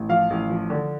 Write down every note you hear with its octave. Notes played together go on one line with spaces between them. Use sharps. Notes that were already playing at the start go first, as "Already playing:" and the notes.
Already playing: A1
F3 F5
A1
F3
D3